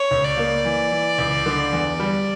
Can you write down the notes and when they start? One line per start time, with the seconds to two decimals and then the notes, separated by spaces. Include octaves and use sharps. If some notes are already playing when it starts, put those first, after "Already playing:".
Already playing: C#5
0.11 C#2
0.24 D5
0.37 A#3
0.65 E3
0.92 E3
1.18 C#2
1.46 D3
1.73 E2
2.00 G3